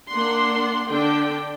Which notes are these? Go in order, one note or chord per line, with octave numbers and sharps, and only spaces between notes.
A#3 D4 F#5 C6
D3 D4 G5